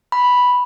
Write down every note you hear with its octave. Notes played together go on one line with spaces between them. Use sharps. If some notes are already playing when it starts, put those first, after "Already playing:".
B5